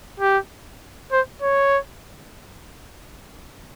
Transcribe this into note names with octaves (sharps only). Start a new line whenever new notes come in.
G4
C5
C#5